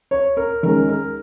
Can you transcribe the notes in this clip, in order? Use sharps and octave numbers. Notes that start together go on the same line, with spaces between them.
C#5
A#4
D#3 G#3 C#4 A#4
A#4